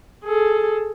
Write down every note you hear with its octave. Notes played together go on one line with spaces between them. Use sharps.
G#4 A4